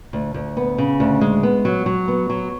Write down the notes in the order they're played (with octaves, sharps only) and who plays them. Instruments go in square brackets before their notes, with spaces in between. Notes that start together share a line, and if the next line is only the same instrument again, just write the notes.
[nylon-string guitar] D2
D2
B3
C#3
D2
G#3
B3
F#3
F#3
B3
F#3